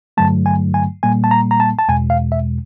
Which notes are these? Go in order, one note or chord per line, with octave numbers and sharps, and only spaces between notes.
G2 D3 F#3 A3 A5
G#5
G#5
A#2 G3 A#3 G#5
A5
A#5
A#5
A5
A5
E2 B2 G#3 G#5
F5
E5